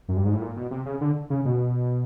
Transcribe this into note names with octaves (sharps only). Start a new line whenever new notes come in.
F#2
G2
G#2
A2
A#2
B2
C3
C#3
D3
C#3
B2